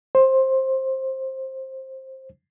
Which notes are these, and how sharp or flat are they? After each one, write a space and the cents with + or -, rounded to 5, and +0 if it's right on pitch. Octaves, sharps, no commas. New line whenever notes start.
C5 +15